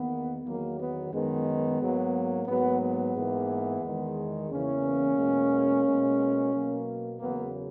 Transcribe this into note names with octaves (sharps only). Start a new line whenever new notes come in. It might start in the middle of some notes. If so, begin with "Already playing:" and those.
Already playing: E2 D#3 A#3 B3
E2 D#3 F#3 A#3
B3
F#2 D#3 G#3 B3
G#2 F#3 A#3
G#2 F#3 A#3 B3
B3
G#2 E3 A#3
E2 D#3 G#3
E2 C#3 E3 A#3 C#4
E2 B2 G#3
B2 G#3
B2 F#3 A#3
E2 C#3 F#3 A#3 B3